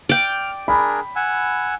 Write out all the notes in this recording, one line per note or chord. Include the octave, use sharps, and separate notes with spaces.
D5 G5 F6
D4 G#4 A#4 B5
F#5 G#5 E6